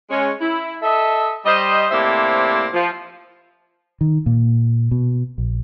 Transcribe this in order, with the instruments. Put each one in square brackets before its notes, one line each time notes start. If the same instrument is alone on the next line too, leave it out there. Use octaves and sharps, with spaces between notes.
[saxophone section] G#3 C#4
E4
A4 D#5 E5
G3 C5 D#5
A2 C3 A#3 C5 D5 E5
F3
[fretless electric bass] D#3
A#2
B2
A#1